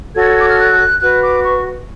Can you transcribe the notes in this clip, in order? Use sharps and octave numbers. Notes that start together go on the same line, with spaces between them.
F#4 A4 C#5 G#6
D6
F6
F#6
F#4 B4 F#6
D6
C#6